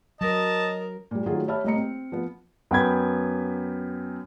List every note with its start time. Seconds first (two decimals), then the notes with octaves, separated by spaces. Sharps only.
0.21 F#3 A#4 D#5 A5
1.11 A#2 G3
1.26 D#3 F#3 A3 F4 G#4
1.47 G4 C#5 E5 A5 B5 F6
1.64 C2 A2 A#3 D#5 A#5 C#7
1.76 C4
2.12 F3 B3
2.71 F#2 B3 G5 B5 G#6